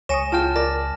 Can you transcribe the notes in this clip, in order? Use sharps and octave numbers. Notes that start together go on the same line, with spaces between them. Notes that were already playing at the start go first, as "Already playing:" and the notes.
C#2 C#5 G#5 C#6 D#6 A#6 E7
F4 G5 A5 F6
A#4 D5 A#6